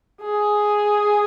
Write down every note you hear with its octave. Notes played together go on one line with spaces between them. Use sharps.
G#4